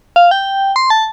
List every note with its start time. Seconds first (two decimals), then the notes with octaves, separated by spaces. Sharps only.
0.16 F5
0.31 G5
0.76 C6
0.90 A5